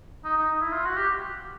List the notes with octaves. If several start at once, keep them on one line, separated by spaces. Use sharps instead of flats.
D#4
D#4
E4
F4
F#4
G4